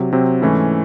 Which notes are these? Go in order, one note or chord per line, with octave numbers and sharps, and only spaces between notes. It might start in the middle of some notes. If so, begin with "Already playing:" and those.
Already playing: C3 F#3
C3 F#3 C4
G#2 E3 A3 C#4 E4